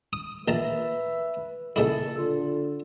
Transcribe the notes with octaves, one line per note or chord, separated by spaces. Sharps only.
D#6
A#1 B4 E5 A5 A#5
A#1 C#3 E4 A4
D3 F4